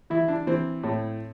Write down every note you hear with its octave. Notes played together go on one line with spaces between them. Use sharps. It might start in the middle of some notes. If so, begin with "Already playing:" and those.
E3 E4
D4
E3 C4
A2